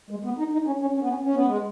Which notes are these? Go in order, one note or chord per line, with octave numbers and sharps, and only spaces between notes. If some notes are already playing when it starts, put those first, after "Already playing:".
G#3
B3
D#4
D#4
C#4
C#4
C#4
B3
C#4
C#4
B3
G#3